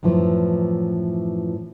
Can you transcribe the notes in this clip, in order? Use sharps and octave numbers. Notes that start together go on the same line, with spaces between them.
F#2 A2 E3 F3